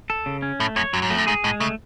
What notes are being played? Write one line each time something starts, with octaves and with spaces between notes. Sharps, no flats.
A4
C#3
C#4
A2 A3
F2 C#5
F#2 F#3
G#2
F2 A3
F#2
G#2 G#4
A2 G#3
C#3 A3